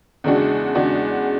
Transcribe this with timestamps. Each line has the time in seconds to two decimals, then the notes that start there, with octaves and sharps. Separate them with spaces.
0.24 E2 C#3 G#3 D4 F#4
0.75 E2 C#3 G#3 D4 F#4